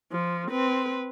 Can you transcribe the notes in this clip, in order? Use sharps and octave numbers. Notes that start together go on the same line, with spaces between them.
F3
C4 B4